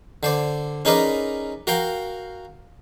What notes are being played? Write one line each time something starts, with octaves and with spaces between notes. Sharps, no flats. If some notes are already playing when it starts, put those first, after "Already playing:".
D3 C5 D5
C#4 D#4 G#4 A#4 B4 D5
F#4 A#4 F5 G5